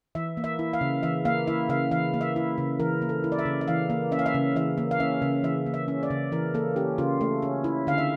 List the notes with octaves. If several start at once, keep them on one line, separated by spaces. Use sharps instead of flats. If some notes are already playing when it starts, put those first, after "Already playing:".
E3 E5
A#3
E5
E4
F5
C#3
E3 E5
A#3 F5
E4 E5
C#3 F5
E3 F5
A#3
E5
E4
C#3
E3 A#4
A#3
A4
E4
D5
E5
C#3
E5
E3 F5
A#3
C#4 E5
F5
E5
C#3
E3 E5
A#3
F5
C#4 E5
C#3
E3 E5
A#3
E5
C#4
D5
C#3
E3 A#4
A#3 A4
C#4 G4
C#3 F4
A3
C#4
E4
D3 F5
E5